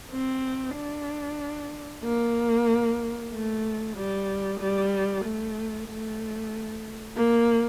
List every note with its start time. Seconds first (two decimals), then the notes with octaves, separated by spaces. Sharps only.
0.12 C4
0.76 D4
2.04 A#3
3.32 A3
3.96 G3
4.60 G3
5.24 A3
5.89 A3
7.16 A#3